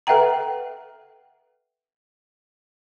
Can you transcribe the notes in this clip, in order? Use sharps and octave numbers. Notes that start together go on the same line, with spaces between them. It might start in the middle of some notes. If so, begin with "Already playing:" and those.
A4 B4 E5 F#5 G5 A#5